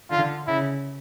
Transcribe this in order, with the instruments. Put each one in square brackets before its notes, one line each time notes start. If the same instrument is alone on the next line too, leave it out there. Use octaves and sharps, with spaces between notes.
[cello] D3 [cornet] F4
[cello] C#3 [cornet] E4